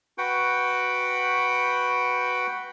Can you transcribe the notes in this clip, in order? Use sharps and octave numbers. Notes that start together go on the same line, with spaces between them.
F#4 B4 F#5 G5